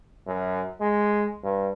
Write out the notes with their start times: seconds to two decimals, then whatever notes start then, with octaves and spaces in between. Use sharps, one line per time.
0.27 F#2
0.81 G#3
1.43 G2